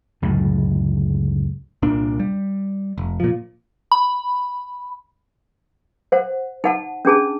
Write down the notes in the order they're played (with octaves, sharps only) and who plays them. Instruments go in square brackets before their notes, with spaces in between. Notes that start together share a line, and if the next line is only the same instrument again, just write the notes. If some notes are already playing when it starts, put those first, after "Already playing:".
[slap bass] C#2 F#2 A2 D3
[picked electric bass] C2 A#2 A#3 D4
G3
F1
A#2 F3
[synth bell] B5
[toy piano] C5 F#5
D#4 F#5 A5
C#4 D4 G#4 A5